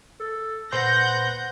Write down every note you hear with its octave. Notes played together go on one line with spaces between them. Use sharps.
A4
A#2 B4 C5 F#5 C6 G6 A#6